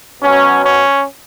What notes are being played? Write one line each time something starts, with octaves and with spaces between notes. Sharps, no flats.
B2 F#3 C#4
C#4